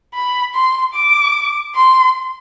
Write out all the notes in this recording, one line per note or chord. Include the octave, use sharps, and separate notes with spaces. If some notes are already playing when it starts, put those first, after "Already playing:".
B5
C6
D6
C6